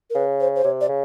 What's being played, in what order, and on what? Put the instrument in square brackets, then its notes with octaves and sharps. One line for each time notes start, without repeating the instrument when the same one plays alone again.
[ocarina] A#4
[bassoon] C#3 [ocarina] B4
[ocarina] C5
C5
[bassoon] C3 [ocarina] C#5
[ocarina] D5
[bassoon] C#3